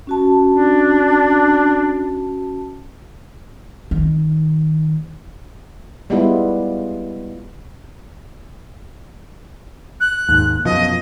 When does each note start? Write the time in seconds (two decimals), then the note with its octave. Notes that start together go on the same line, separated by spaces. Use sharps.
0.07 C#4 F#4 A5
0.50 D4
3.91 D#3
6.10 G3 G#3 B3 E4 F4
10.01 F#6
10.28 D#2 G#2
10.65 F#2 B2 F3 D#5